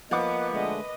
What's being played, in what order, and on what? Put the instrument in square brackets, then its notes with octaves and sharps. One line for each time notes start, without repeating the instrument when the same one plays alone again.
[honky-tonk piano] F3 F#5 D6 [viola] A#3 B4 [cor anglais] B3 [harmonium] D#5
[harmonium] D3 G#3 A3 [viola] B4 D#5